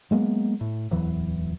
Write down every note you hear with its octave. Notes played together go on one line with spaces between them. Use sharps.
F#3 G#3 A#3 B3
A2
D1 E2 E3 F#3